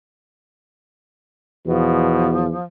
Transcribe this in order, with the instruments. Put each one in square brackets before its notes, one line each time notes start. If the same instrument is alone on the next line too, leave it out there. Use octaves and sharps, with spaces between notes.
[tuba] E2 [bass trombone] B2 [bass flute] F3